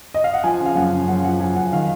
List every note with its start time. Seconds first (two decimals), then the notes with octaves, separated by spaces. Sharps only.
0.14 D#5
0.24 F5
0.34 F#5
0.44 F3 G#5
0.60 C#3
0.66 F5
0.76 F#2 F#5
0.93 C#3
1.08 F#2 F#5
1.24 F3 F#5
1.40 F3 G#5
1.56 F#2 F#5
1.72 D#3 F5